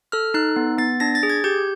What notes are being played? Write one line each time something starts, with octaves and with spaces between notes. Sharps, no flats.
A4 F6
D#4 F#6
B3
B3 A6
D4 A#6
A6
G#4
G#6
G4 G6